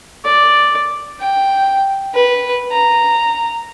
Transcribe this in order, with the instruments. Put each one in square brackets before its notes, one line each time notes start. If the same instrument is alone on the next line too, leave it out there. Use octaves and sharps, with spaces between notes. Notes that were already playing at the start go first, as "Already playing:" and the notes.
[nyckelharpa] D5
[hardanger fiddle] G5
B4
A#5